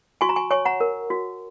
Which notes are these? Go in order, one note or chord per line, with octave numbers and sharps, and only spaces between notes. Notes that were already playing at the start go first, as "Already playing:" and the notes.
F#4 G#5 C#6
A#5
G#5 C#6
C#5 G#5 C#6
F#5 A#5
A#4
F#4